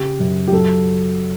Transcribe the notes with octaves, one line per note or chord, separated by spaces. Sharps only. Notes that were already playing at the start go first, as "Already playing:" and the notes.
Already playing: C#3 G4
F#2
G4
F#3 A4